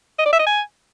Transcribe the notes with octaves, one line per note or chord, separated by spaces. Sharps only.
D#5
D5
E5
D#5
G#5